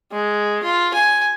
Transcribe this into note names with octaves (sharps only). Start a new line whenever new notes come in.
G#3
F4
G#5